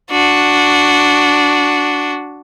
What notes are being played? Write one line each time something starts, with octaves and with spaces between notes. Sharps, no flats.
D4 F#4